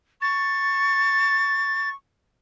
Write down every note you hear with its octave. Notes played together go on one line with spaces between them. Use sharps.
C#6 A6